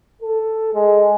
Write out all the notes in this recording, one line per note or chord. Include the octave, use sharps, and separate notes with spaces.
A4
G#3